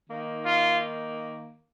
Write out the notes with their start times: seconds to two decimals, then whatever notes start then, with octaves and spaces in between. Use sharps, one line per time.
0.10 D#3 A#3 D#4
0.45 F4